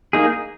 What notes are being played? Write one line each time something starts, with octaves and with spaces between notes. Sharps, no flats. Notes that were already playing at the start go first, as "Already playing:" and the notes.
A#3 D#4 G#4